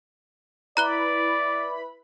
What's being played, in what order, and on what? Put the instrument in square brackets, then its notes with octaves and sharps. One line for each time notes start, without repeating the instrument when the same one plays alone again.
[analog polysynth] E4 B4 B5 [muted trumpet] D5 [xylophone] A#5 F#6 G7